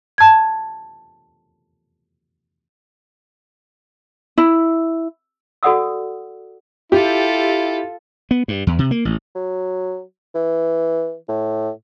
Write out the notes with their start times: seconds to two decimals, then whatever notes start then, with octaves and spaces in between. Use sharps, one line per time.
0.18 A5 G#6
4.38 E4
5.63 F#4 A4 D5 F#5 D#6 E6
6.92 E4 F4 G4 A4
8.31 B3
8.48 G2
8.67 E2
8.79 C3
8.91 A#3
9.05 A1
9.35 F#3
10.35 E3
11.29 A2